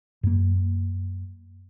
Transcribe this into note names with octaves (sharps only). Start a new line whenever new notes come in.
F#2 A#3